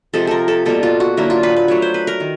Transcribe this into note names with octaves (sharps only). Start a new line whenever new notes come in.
C3 F3 G#3 C4 A4
A4 A#4
A4
B2 G3 A#3 A4
F4
F#4
D3 F#3 A#3 D4 E4
F4
B4
B4
F#3 A3 D4 C#5
C5
B4
A#4
D#3